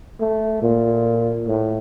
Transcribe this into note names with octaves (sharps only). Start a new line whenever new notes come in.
A3
A#2
A2